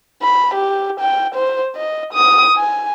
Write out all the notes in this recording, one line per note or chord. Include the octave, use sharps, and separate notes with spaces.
B5
G4
G5
C5
D#5
D#6
G#5